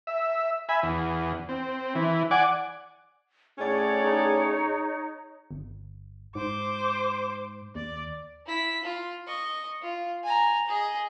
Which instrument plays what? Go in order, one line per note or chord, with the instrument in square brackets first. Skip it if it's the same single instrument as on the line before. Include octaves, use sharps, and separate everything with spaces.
[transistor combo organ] E5
E5 G#5 B5
E2
C4
E3
D5 F#5 G#5 D6
[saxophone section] A2 C#4 D5 [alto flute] G#4 [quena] C#5
[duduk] D#4
[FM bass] G1
[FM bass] G#2 [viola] C5 D6
[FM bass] D#2 [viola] D5
[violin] E4 B6
F4
D#5 C#6
F4
G#5 A#5
G#4 D#5